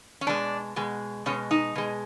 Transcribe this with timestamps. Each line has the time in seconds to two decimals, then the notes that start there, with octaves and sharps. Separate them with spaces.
0.21 C#4
0.27 B2 G#3 D4
0.76 B2 G#3
1.26 B2 G#3 C#4
1.51 D#4
1.75 B2 G#3